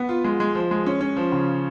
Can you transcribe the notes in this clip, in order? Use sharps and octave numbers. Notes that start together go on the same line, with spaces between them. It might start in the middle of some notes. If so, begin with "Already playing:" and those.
Already playing: B3
F4
G#3
G#3
F3
G#3
C#4
C#4
F3
C#3